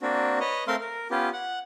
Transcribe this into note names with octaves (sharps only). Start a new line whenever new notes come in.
A#3 C4 D4 F#4
B4 C#5 D#5
A3 C4 A#4 E5 F5 C6
A#4
B3 C#4 F4 G4
F#5